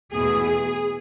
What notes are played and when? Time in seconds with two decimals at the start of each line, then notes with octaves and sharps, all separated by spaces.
0.14 E2 B2 A3 E4 G#4
0.49 G#4